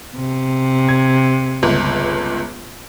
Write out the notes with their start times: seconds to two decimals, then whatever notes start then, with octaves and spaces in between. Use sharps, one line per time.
0.16 C3
0.88 G#6
1.63 G1 C#2